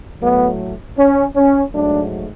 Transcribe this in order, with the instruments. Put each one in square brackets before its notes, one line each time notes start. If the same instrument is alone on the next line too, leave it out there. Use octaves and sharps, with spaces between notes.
[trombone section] A2 F#3 A3 B3
C#4
C#4
G#2 F#3 A3 D4